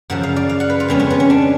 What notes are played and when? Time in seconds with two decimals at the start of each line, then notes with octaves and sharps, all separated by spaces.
0.10 F#2 C#3 F3 F#5
0.23 F5
0.36 D5
0.49 F5
0.60 F#5
0.70 B4
0.80 F4
0.88 F2 C#3 G#3 B3 C#4
1.00 C#4
1.10 B3
1.20 C#4
1.30 D4